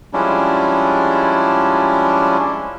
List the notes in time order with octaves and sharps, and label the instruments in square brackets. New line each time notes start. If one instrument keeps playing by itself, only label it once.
[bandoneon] F3 G3 G#3 C#4 D4 E4